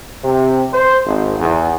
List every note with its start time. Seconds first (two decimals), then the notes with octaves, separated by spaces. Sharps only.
0.23 C3
0.73 C5
1.06 G#1
1.39 E2